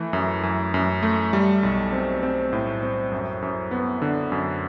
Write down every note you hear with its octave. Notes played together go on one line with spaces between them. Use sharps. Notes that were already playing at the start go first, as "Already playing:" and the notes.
Already playing: E3 A3
F#2
F#2
F#2
A3
G3
B1
C4
C4
A2
C4
F#2
F#2
B3
D3
F#2